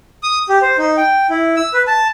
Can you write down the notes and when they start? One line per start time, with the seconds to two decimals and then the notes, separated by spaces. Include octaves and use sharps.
0.23 D#6
0.49 G4
0.62 C5
0.78 D#4
0.97 G5
1.30 E4
1.56 E6
1.74 B4
1.87 A5